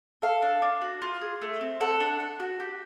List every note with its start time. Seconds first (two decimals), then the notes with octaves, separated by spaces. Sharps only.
0.22 A4 F5
0.42 D4
0.62 D4
0.81 F#4
1.02 F4
1.21 G#4
1.42 A3
1.61 C4
1.80 A4 F#5
2.00 D4
2.20 D4
2.40 F#4
2.60 G4